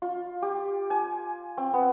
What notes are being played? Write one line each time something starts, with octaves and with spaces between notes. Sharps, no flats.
F4
G4
G#5
C4
B3